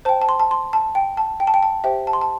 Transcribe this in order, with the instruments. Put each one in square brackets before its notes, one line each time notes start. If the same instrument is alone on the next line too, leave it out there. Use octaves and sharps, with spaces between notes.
[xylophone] C5 G5 A5
A5
C6
A5
C6
A5
G5
A5
G5
A5
G5
A5
G4 C5 E5 G5
A5
C6
A5